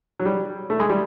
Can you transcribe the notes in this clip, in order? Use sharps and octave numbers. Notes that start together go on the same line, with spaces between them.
F#3
G3
A3
G#3
G3